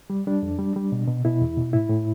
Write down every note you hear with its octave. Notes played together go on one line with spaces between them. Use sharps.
G3
G3 D4
F2
G3
G3
B2
B2
B2 E4
E2
B2
A2 E4
A2